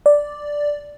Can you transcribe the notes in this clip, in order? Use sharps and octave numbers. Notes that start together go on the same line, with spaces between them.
D5